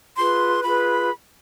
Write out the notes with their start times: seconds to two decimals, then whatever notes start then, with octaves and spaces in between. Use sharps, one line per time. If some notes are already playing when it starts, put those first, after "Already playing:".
0.16 F4 G#4 B4 C6
0.63 F4 G#4 B4 B5